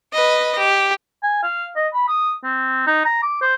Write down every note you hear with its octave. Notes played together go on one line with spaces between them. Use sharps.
B4 D#5
G4
G#5
F5
D#5
B5
D#6
C4
D#4
A#5
D6
C5